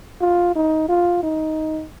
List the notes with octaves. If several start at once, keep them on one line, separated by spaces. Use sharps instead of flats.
F4
D#4
F4
D#4